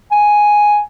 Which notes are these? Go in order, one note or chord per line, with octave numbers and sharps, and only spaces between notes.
G#5